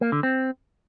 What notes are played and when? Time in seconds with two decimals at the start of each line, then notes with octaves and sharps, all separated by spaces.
0.01 A#3
0.12 D3
0.23 C4